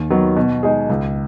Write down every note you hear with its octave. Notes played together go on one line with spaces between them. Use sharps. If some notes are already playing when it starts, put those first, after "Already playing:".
Already playing: D#2
D#3 F#3 B3
B2
G#3 D#4 G#4
C#2